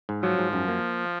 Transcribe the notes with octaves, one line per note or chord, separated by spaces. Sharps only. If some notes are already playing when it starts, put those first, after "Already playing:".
G#2
F3 F#3
G#2
F#2
A#3